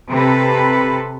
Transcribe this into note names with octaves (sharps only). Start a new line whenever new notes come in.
C3 A4 B4